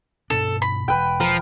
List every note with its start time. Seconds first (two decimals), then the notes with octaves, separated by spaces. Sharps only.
0.30 G2 B2 D4 A4
0.62 B5
0.88 E1 B4 G5
1.20 F3 A#4